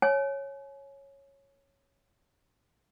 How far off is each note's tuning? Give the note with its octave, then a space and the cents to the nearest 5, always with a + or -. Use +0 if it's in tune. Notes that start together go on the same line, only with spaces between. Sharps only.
C#5 -5 G#5 +35